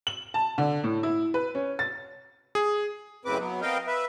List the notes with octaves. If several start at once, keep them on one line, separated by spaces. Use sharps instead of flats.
F#7
A5
D3
A2
E4
B4
C#4
A6
G#4
F#2 A2 C#3 C4 B4 D6
F#3 B3
B3 C4 A#4 D#5 F5 G5
B4 E5